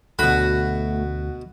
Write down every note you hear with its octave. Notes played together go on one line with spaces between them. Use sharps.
D2 B2 A3 F#4 B5